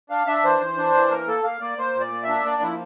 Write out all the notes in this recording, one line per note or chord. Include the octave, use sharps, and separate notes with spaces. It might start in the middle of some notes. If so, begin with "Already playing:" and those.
D4 F5
D4 E5
E3 C5
E3
D4
E3
A#3 A#4
A#3 A4
A#3 F5
A#3 D5
A#3 C5
A#2
D5
A#3
E5
D4
A#3 D5
F3 E4